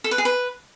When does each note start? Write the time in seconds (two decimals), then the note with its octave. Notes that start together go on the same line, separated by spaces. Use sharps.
0.04 A4
0.11 B4
0.18 G#4
0.25 B4